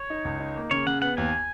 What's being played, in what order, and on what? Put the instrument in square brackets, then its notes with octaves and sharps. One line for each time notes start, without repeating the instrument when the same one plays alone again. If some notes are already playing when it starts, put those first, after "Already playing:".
Already playing: [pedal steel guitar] C#5
[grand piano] D#4
C#2
D#4
A#3
[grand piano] C#3 [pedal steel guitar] C#5
[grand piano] C#3 [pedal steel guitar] F#5
[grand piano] B3 [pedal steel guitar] F#5
[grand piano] D#2 [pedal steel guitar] G#5